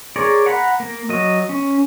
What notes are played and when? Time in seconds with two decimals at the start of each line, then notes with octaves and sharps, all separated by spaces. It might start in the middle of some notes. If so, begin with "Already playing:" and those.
0.16 G#4 A#4 C#5 D5
0.46 F#5 A#5 B5
0.80 A#3
1.09 F#3 D#5
1.49 C#4